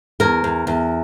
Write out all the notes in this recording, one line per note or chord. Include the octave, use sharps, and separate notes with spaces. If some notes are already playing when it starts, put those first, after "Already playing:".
E2 A#4
E2
E2